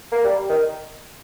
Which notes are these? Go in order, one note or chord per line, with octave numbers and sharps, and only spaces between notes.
A#3
G3
D#3